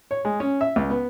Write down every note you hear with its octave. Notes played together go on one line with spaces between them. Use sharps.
C#5
G#3
C#4
E5
C#2
B3